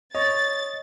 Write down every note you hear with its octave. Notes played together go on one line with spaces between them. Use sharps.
C#5 D#5 A6